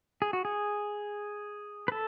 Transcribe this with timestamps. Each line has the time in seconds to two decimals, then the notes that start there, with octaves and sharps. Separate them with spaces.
0.22 G#4
0.33 F#4
0.45 G#4
1.88 B4
1.92 A4